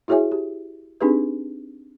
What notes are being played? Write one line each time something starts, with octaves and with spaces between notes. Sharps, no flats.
E4 F#4 G#4 C#5 E5 G#5
G4
C4 D4 D#4 G4 G#4 B4